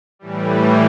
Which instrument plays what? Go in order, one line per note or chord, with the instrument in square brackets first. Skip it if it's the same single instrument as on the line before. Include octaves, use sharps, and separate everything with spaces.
[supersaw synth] A2 E3 G3